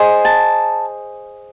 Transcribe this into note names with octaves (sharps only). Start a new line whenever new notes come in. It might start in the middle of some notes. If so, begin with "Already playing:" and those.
Already playing: G#4 C5 D#5
A5